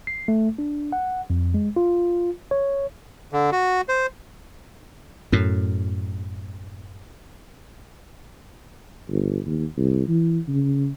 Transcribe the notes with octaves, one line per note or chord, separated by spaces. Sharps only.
C7
A3
D4
F#5
F2
G#3
F4
C#5
D3
F#4
C5
F#2 A2
G1
D#2
C2
E3
C#3